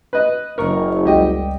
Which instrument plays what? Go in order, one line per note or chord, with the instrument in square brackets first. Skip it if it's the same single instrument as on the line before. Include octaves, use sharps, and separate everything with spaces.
[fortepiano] B4 D#5
[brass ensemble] F#1 [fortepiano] A#4 [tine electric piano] D#5 C#6
[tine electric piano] C#2 G3 [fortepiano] G4 D#5 G5